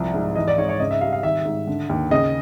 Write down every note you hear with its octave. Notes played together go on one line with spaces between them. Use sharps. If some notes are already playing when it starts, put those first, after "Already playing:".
Already playing: C2 F3
G#2
E3 D#5
D5
G#2 C#5
C#5
C#3 D#5
E5
G3 F5
F5
D#3 E5
G#2
D3
D#2
C#3 D#5